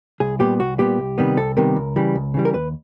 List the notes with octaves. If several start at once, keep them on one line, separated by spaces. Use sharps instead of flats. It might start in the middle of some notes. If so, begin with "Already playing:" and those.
C2 G#4
A#2 G3 B3 G4
C2 F#4
A#2 G3 B3 G4
C2
C3 D#3 G3 B3
C2 A4
C3 D#3 G3 B3 A#4
C#2
C#3 E3 G3
C#2
C#3 E3 G3
A#4
D#2 B4